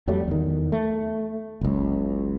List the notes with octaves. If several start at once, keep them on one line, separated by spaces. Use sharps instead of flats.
F2 F#3 G3 A3
E2 D#3
A3
F#1 C#2